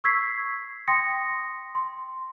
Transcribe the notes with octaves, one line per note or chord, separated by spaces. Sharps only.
C#6 E6 G#6 B6 C7
G5 C6 D#6 A#6 C#7
C6